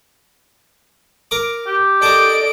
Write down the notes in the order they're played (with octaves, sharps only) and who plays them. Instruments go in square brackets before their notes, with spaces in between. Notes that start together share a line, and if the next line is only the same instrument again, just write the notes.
[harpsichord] A#4 D6
[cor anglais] G4
[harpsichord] A4 A#4 [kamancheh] D5 D#5 [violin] D7